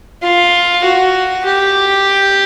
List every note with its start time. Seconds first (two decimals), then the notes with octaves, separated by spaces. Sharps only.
0.23 F4
0.84 F#4
1.46 G4